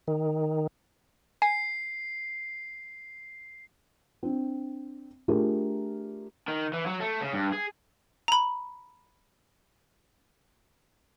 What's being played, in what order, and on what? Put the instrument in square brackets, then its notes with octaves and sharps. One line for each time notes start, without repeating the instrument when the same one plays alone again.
[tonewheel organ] D#3
[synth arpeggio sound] G#5 [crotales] C7
[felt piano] C4 D4
A3 D4 F4 G4 G#4 A#4
[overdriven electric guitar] D#3
E3
F#3
A3
C#3
G2
G#4
[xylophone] A#5 B5